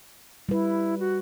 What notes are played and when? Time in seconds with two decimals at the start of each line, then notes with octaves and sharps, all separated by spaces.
0.49 G3 E4 B4
0.99 F#4